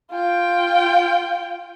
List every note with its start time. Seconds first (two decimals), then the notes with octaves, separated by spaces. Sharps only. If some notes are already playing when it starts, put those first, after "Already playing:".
0.11 F4 G5